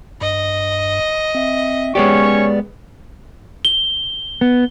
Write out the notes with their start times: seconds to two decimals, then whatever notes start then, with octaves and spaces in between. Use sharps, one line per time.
0.21 G2 D#5
1.35 C4 E5
1.95 G#3 B3 C#4 G4 C#5 D5 C#6
3.65 G7
4.41 B3